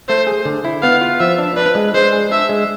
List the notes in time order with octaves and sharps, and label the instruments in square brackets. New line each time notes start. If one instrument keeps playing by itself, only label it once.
[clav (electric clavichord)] A3 [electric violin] C5
[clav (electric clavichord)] G#4
D3
E4
[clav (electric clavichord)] B3 [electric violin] F5
[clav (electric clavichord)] F4
[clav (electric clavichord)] F3 [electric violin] E5
[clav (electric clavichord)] D4
[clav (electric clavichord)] D4 [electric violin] B4
[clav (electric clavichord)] G#3
[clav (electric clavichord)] G#3 [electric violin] C5
[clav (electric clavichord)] G#4
[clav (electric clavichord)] D4 [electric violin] E5
[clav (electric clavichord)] G#3